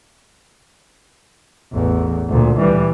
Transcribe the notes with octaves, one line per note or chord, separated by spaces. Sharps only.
A1 E2
D2 A#2
E3 G3